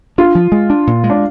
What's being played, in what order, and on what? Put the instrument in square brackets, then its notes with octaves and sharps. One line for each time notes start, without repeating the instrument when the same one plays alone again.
[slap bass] D4 [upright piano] F4
[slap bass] F3
G#3
D4
A#2
G#3
[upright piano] D4